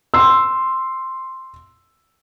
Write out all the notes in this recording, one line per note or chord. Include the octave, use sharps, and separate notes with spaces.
C6 E6